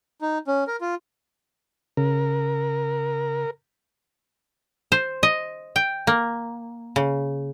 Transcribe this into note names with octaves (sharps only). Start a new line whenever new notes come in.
D#4
C#4
A#4
F4
C#3 A#4
C5
D#5
G5
A#3
C#3